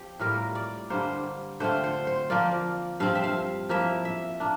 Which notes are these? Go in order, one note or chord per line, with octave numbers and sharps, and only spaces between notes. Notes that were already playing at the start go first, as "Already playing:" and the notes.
Already playing: F3 C4 G4
A2 G3 A#3 F4 A#4
D5
G2 D3 G3 A#3 C5
D3 A3 C4 F4 C5
C5
C5
F3 A#3 F4 D5
G2 F3 C4 F5
E5
F5
F3 A#3 E4 E5
E5
A#3 D4